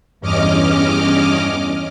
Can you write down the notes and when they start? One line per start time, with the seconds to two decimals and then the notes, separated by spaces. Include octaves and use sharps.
0.20 E2 G2 C#4 D#5 D6 F6